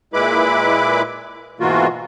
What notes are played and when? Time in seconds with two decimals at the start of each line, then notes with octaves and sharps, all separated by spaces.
0.14 A#2 G#3 E4 B4 B5 D6
1.60 G#2 B2 E3 A#3 F4 F#4